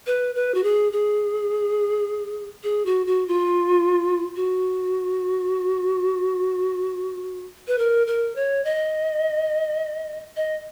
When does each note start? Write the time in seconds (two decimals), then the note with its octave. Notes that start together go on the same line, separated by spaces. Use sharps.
0.07 B4
0.35 B4
0.55 F#4
0.64 G#4
0.92 G#4
2.64 G#4
2.86 F#4
3.07 F#4
3.28 F4
4.36 F#4
7.68 B4
7.78 A#4
8.07 A#4
8.36 C#5
8.65 D#5
10.36 D#5